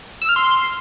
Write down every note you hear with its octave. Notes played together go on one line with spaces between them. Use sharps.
E6
F6
C6